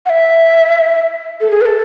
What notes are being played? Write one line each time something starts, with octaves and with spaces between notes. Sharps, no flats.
F#5
E5
A4
G#4
B4
A4